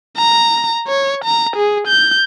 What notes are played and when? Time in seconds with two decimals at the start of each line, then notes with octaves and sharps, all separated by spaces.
0.18 A#5
0.87 C#5
1.24 A#5
1.57 G#4
1.88 G6